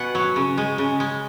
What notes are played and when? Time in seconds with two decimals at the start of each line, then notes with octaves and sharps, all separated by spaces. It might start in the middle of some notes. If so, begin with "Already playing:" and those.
Already playing: B2 F#5 G#5
0.15 F#3
0.36 C#3
0.58 G#3
0.78 C#3
1.00 G#3